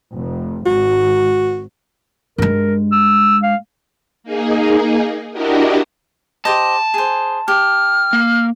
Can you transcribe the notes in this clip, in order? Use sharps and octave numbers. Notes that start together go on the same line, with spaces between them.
F1
G#1 F#4
G2 G#3 A#4
E6
F5
A#3 D#4 G#4
D4 E4 F#4 G4 A#4 D#5
G4 C5 D#5 A5
G#4 C5
G4 F6
A#3